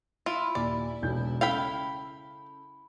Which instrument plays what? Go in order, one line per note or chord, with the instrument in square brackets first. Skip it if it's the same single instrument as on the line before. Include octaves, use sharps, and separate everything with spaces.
[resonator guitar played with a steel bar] E4 [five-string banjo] F4
[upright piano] D#2 A#2 [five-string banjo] D5
[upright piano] E1 B1 G6
[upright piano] C#3 A4 [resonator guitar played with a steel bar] E4 [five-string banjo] F5 G5 B5